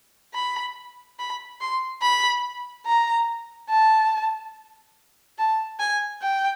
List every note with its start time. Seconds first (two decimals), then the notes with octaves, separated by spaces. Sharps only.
0.34 B5
1.19 B5
1.61 C6
2.02 B5
2.86 A#5
3.70 A5
5.38 A5
5.80 G#5
6.22 G5